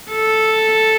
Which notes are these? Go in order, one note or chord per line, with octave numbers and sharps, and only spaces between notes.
A4